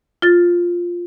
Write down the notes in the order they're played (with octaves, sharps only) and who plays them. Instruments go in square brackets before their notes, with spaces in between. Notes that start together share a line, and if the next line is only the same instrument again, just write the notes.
[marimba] F4 A6